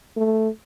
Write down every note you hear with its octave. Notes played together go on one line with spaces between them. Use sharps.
A3